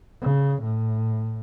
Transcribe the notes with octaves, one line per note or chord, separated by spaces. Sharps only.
C#3
A2